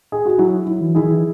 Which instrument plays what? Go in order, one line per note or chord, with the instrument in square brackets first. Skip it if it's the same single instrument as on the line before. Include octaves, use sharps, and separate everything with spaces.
[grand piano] G#4
F#4
[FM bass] F#3 [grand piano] E4
[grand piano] E4
[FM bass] E3
[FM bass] D#3 [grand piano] E4 G#4
[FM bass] E3